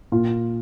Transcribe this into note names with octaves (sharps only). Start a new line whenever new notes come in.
A#2 F4